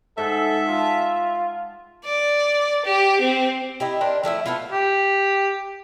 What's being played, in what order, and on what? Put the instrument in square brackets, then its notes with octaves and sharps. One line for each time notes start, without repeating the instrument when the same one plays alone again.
[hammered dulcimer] G#2 F#5 [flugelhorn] A4 [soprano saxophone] E5
[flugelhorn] F4 [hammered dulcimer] A5
[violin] D5
G4
C4
[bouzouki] D#4 E4 G4
D4 A#4 C5
F3 A3 E4 E5
A3 B3 E4 F4
[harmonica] G4